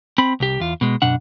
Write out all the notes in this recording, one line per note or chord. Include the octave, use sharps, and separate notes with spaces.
C4 B5
C2 G4
E2 F4
B2 G#3
F#2 B2 D4 F#5